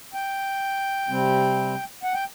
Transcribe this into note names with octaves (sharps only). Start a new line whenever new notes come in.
G5
C3 G3 C4
F#5
G5